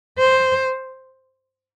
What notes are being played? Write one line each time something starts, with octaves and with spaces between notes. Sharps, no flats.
C5